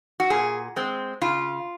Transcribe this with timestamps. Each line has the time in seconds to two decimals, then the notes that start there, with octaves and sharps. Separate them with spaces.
0.20 F#4
0.30 A#2 G#4
0.76 G#3 C4
1.21 C#3 F4